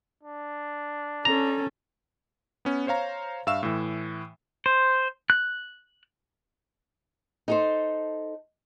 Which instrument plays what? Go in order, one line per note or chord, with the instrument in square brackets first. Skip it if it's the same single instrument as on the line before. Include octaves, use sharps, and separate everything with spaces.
[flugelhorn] D4
[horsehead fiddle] C#4 A4 [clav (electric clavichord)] A#5
[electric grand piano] B3 C#4
C5 C#5 F5 A#5
G2 E5 F5 C#6 E6 E7
A2 E3
[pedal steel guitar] C5
F#6
[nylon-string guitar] D#4 A4 C5